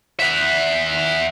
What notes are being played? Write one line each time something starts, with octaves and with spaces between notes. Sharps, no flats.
E5 F#5